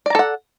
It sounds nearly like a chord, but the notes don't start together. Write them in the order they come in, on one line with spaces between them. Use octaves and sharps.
D5 A#5 A4 F#5